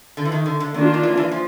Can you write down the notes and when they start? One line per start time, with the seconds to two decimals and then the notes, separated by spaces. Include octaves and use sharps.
0.17 D3
0.25 E3
0.32 D#3
0.46 D3
0.60 D3
0.74 D#3 A#3 D4 F4
0.94 D#3
1.03 E3
1.17 E3
1.31 F3